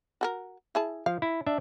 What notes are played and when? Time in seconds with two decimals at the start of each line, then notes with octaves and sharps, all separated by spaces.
0.21 F#4 A4 A#4
0.75 E4 G#4 A5
1.06 F3 F5
1.22 E4
1.46 D4 E5